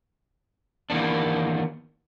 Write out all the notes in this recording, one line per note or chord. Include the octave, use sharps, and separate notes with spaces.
D#3 E3 A#3 B3 D4